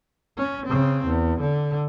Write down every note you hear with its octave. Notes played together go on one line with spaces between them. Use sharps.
C#4
C#3 C4
E2
D3